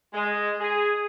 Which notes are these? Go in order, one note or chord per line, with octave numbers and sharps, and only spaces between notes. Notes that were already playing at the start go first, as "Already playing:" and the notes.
G#3
G#4